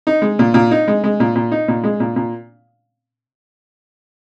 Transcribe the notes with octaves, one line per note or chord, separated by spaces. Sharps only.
D#4
G#3
A#2
A#2
D#4
G#3
G#3
A#2
A#2
D#4
A#2
G#3
A#2
A#2